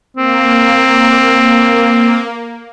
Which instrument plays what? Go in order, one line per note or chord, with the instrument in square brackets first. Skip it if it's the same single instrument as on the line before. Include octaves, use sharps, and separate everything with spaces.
[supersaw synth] A#3 [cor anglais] C4